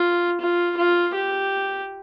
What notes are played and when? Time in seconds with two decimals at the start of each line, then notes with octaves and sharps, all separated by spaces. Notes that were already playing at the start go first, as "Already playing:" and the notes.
Already playing: F4
0.41 F4
0.77 F4
1.14 G4